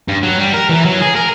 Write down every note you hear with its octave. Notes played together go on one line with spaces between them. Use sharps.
G2
F#3
G3
A#4
E3
F#3
G#4
A#4